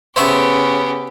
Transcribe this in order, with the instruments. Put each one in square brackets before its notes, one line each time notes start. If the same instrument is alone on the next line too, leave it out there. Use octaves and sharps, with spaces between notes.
[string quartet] C#3 C#4 G4 [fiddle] B3 [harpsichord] C5 E5 C#6